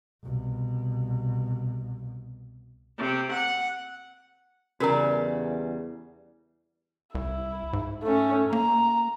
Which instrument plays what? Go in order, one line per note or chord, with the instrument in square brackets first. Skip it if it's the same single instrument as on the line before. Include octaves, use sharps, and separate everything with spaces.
[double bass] C2 B2
[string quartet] C3
F#5
[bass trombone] E2 [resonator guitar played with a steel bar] C#3 G3 [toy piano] F#4 A#4 A#5
[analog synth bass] C2 [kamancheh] E4
[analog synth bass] G#2
[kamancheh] A3 C#4
[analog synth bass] A#3 [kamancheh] A#5